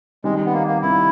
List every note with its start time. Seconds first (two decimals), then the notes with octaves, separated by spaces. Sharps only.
0.24 D#3 G3 G#3 C4 D#4
0.46 B3
0.53 A#3
0.67 A#3
0.82 D#3 G3 C4 D#4 E4